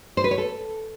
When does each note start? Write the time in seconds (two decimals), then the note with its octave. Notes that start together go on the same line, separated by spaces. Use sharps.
0.17 C5
0.24 B4
0.31 C#5
0.38 A4